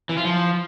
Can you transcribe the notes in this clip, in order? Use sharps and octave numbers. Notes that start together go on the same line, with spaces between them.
E3
F4
F3